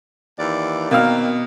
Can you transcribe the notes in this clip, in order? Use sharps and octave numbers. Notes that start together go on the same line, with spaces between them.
D#2 E3 D5
B2 D#3 A#3 C4 F5 F6